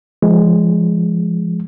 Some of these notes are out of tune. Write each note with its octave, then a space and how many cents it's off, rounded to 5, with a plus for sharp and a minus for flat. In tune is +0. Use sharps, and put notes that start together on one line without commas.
F3 -30 G#3 +0